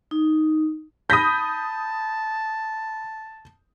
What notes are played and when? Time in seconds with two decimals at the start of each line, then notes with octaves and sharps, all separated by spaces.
0.11 D#4
1.10 A5 B5 D#6 G6 A#6 B6